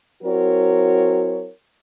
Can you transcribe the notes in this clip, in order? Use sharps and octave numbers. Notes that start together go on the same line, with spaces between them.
F#3 C4 E4 F#4 A#4 C#5